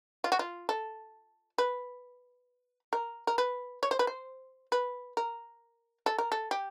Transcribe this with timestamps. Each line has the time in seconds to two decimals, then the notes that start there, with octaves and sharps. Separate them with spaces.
0.24 F4
0.32 F#4
0.39 F4
0.69 A4
1.58 B4
2.93 A#4
3.27 A#4
3.38 B4
3.83 C#5
3.91 C5
3.99 B4
4.07 C5
4.72 B4
5.17 A#4
6.06 A4
6.18 A#4
6.32 A4
6.51 G4